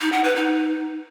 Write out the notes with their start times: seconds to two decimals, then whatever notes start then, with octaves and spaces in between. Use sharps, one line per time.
0.01 D#4
0.12 F#5
0.24 B4
0.36 D#4